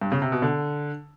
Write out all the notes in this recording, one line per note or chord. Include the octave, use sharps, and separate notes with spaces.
G2
C#3
C3
B2
D3